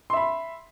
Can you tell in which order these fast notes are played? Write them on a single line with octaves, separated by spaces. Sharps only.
C6 E5 B5